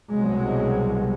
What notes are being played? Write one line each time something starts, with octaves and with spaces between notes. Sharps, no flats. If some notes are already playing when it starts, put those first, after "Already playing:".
C2 B2 F#3 G#3